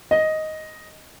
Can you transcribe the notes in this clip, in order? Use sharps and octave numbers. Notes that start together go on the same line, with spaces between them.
D#5